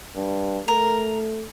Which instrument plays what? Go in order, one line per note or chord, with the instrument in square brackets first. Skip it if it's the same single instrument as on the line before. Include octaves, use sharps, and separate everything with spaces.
[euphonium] G2
[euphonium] A3 [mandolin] A#4